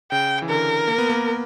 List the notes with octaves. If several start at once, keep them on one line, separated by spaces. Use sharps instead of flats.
C#3 G5
E3
D3 A#4
A#3
B3
A#3